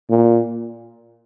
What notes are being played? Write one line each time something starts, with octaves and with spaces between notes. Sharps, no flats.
A#2